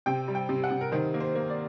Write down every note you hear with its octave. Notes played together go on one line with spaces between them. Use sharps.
C3 G5
G3
G5
C3
F#5
C3
A#4
D#3 C5
A#3
C5
A#3
D5